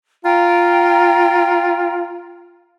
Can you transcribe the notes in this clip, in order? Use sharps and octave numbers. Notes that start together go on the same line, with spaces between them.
F4 G5 A#5